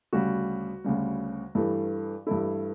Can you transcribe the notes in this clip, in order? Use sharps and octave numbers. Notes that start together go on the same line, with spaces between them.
D2 C#3 G3 F#4
D2 C#3 G3
G2 E3 A3
G2 E3 A3 E4